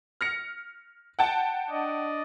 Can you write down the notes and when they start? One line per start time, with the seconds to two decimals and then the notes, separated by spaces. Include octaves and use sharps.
0.21 F6 A#6 C#7
1.19 F#5 G5 A5
1.70 D4 D5 D#5